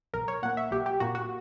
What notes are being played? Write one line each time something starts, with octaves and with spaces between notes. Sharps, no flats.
B1 A#4
C#5
A#2 A#3 F#5
E5
B1 G4
G4
A#2 A#3 F#4
F#4